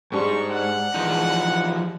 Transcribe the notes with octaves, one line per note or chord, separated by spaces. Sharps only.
G#2 G3 G#3 D4 C#6
F#5
E3 F3 D#4